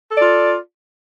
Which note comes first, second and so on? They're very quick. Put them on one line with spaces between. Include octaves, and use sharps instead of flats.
A4 D5 F4